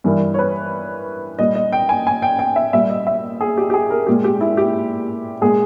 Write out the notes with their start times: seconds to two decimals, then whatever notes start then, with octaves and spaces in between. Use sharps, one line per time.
0.04 G2 E3 G3 A#4
0.34 C#5
0.39 B4
1.39 A#2 G3 D#5
1.55 D#5
1.73 G5
1.89 G#5
2.07 G#5
2.22 G5
2.39 G5
2.56 E5
2.73 A#2 G3 E5
2.90 D#5
3.07 E5
3.41 G#4
3.58 G4
3.70 G4
3.74 G#4
3.90 A#4
4.07 A#2 G#3 G4
4.24 G4
4.41 E4
4.57 G4
5.41 A#2 G#3 G#4